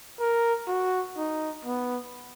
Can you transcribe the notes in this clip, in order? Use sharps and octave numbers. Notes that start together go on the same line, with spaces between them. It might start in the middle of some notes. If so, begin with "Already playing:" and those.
A#4
F#4
D#4
B3